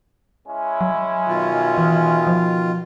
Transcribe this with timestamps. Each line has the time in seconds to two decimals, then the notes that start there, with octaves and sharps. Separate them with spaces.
0.48 G#3 C#4 E4
0.81 F#3
1.28 B2 D#3 F4
1.78 E3
2.27 F3